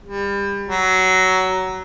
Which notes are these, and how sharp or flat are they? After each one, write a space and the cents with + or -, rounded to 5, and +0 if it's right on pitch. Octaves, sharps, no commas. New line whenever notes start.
G3 +30
F#3 +15